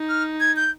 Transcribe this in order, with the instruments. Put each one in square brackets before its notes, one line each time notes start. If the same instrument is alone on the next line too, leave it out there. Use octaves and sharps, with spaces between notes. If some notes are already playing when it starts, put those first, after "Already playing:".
Already playing: [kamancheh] D#4
[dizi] F6
G#6
G6